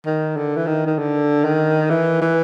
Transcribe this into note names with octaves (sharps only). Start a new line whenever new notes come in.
D#3
D3
E3
D#3
D#3
D3
D#3
E3
E3